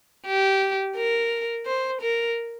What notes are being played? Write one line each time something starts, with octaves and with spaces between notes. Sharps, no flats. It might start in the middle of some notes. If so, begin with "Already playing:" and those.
G4
A#4
C5
A#4